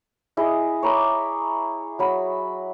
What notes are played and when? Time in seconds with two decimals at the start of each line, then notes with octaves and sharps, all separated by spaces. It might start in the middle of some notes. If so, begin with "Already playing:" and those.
0.37 E4 G#4 D#5
0.83 C#5 A#5 B5 D6
1.99 F#3 B5